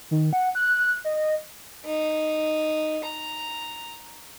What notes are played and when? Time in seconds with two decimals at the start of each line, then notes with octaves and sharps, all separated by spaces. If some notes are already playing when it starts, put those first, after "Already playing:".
0.11 D#3
0.33 F#5
0.55 F#6
1.05 D#5
1.85 D#4
3.04 A#5